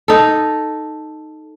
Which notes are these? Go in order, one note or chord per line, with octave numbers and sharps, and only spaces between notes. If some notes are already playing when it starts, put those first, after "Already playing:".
D#4 A4